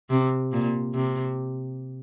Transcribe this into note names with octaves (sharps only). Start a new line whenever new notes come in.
C3
A#2
C3